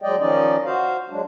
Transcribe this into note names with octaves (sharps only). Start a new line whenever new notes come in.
D#2 F#3 G#3 D5 D#5 G5
D#3 F3 C#4 D#4 D5 D#5
F#4 C5 F5
F#3 G#3 D4